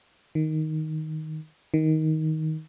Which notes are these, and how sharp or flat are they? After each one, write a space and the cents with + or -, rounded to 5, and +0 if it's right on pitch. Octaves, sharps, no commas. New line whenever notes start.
D#3 +5
D#3 +15